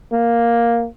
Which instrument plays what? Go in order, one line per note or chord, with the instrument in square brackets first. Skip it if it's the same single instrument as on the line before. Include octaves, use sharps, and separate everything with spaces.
[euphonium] A#3